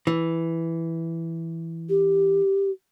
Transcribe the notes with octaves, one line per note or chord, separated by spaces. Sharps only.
E3
G4